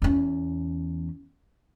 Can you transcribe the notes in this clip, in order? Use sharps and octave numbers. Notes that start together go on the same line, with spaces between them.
E2 C#4